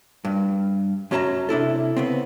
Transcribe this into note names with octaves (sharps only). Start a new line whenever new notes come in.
G2
F#2 F#3 C#4 A4 A5 A#5
C3 D4 E4 A4
C#3 B3 C4